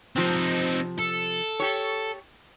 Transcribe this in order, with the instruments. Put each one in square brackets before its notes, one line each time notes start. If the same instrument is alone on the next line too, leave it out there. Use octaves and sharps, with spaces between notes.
[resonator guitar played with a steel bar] C3 F3 [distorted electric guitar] C4 D#4
[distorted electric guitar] A4
[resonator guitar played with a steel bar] G4 C#5